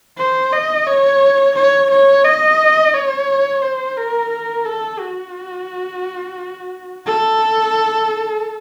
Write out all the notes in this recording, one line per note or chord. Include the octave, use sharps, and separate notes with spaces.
C5
D#5
C#5
C#5
C#5
D#5
C#5
C5
A#4
A#4
A4
F#4
A4